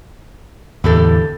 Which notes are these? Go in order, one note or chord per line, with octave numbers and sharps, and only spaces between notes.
E2 A2 D3 E4 G4 A4